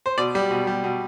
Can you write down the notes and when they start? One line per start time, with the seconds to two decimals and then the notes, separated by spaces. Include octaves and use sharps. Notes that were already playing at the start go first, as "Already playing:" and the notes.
0.06 C5
0.18 B2 D5
0.35 G3
0.51 B2
0.67 G3
0.84 B2